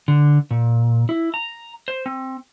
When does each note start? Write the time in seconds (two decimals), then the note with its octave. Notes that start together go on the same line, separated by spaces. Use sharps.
0.08 D3
0.51 A#2
1.09 E4
1.34 A#5
1.88 C5
2.06 C4